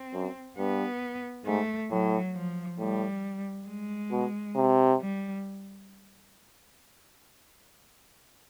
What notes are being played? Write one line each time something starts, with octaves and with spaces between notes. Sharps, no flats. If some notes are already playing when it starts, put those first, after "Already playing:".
Already playing: C4
F#2
G2 B3
G#2 A3
A2 F#3
F3
A2 G3
G#3
B2
C3
G3